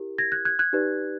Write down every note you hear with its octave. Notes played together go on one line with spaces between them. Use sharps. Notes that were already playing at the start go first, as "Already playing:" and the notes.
Already playing: E4 G4 A#4
G#6 A#6
F#6 G#6
F#6 G#6
F#6 G#6
D#4 G4 B4 D5